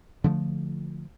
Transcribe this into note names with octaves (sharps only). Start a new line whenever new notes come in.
D3 F3 G3 A3